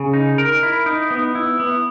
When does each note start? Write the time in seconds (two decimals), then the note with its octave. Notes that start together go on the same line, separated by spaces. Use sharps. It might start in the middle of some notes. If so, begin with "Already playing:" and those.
Already playing: C#3
0.13 D#4
0.38 A#4
0.63 E4
0.86 D#4
1.11 B3
1.35 E4
1.60 B3